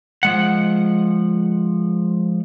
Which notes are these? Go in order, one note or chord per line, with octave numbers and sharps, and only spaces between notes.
F3 G#3 F#5